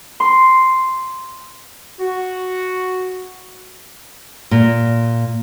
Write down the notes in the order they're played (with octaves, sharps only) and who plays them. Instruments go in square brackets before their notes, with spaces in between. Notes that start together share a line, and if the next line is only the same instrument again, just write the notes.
[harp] C6
[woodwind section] F#4
[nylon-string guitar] A#2